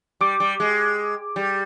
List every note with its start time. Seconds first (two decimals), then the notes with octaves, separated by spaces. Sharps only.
0.21 G3 D6
0.40 G3
0.60 G#3
1.36 G3